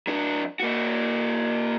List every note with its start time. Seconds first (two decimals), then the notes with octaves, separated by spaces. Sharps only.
0.07 F#3 D4
0.60 A#3 F#4